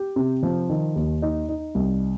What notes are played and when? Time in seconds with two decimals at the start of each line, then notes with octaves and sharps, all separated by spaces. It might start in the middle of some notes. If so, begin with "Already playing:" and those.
Already playing: G4
0.16 C3
0.43 F3
0.69 D#3
0.96 D#2
1.22 D#4
1.49 D#4
1.75 C2